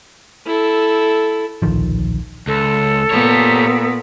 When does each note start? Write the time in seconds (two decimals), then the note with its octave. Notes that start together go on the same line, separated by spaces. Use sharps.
0.46 E4 A4
1.62 D1 A#1 D#3 F3
2.47 C#2 A4
3.11 A#2 B3 G4 C#5